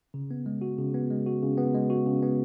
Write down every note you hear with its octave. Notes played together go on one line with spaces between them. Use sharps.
C#3
B3
G#3
F#4
C#3
B3
G#3
F#4
C#3
B3
G#3
F#4
C#3
B3